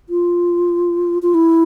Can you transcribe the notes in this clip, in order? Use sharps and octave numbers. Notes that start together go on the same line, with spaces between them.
F4
F4
E4